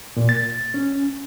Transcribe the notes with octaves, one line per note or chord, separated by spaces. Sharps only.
A#2
A6
C#4